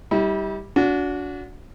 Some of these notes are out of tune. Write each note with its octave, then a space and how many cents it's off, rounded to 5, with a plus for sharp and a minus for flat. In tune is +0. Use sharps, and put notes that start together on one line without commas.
G3 +0 E4 -40
D4 -35 F#4 -20